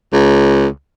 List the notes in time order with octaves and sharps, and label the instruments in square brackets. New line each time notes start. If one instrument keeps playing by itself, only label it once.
[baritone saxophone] C#2